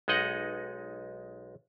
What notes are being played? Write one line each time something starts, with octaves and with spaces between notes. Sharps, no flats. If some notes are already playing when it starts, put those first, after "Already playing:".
B1 G#3 D#4 D#5 F#5